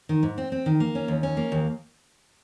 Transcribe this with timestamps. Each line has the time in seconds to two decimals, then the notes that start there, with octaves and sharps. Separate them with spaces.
0.09 D#3
0.23 G#2
0.38 C4
0.52 C4
0.66 D#3
0.80 A#3
0.95 C#4
1.08 D#2
1.23 C#4
1.37 A#3
1.52 D#2